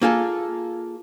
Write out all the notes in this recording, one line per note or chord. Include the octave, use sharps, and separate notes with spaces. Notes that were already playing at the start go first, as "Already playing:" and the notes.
A#3 F4 G#4 A4